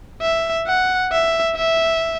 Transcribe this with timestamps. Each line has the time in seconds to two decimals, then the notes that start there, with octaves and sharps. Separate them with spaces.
0.22 E5
0.67 F#5
1.12 E5
1.56 E5